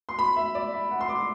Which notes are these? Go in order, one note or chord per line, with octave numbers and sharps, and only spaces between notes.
C6
B5
E5
D5
E5
F#5
C6
D6